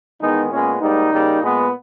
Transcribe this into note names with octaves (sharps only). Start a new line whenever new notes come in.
E2 D#3 G#3 B3 D#4
A#2 G#3 B3 C#4
G#2 G3 A#3 D#4
C#3 G3 A#3
A#2 G#3 B3